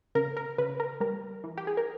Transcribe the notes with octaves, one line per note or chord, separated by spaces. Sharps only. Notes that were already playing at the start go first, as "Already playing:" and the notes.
C#3 A#4
A#4
C#3 B4
A#4
G3 A#4
E3
G4
G#4
A#4